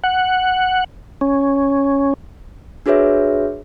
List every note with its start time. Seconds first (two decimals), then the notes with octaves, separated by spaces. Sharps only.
0.04 F#5
1.21 C#4
2.86 D4 F#4 G#4 B4 C#5 E5